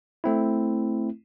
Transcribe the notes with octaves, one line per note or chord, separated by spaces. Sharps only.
A3 C4 E4